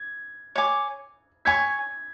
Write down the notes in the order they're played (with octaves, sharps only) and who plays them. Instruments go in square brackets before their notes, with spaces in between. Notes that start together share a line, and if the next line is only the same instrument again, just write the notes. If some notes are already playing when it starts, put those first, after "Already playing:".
Already playing: [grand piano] G#6
[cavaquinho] C#5 G#5 D6
[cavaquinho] C#5 G#5 C#6 [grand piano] G#6 B6